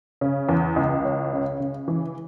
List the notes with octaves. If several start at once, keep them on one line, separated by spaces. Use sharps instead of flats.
C#3
E2
C#2
C#4
C#3
C#3
E3